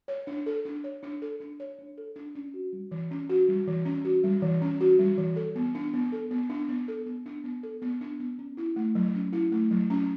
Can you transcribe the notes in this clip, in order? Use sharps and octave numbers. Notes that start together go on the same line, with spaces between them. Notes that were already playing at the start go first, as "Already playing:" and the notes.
C#5
D4
A4
D4
C#5
D4
A4
D4
C#5
D4
A4
D4
C#4
F#4
G3
E3
C#4
F#4
G3
E3
C#4
F#4
G3
E3
C#4
F#4
G3
E3
A4
B3
D4
B3
A4
B3
D4
B3
A4
B3
D4
B3
A4
B3
D4
B3
C#4
E4
A3
F#3
C#4
E4
A3
F#3
C#4